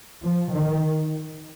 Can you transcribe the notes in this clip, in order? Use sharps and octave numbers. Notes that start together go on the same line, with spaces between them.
F3
D#3